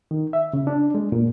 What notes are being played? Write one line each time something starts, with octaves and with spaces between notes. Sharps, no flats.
D#3
E5
C#3
D4
G#3
A#2